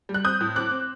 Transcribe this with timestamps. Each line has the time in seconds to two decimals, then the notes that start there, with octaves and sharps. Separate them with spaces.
0.09 G3
0.14 F#6
0.24 C4 D#6 G6
0.41 A2
0.55 C4 D6 F#6
0.71 C4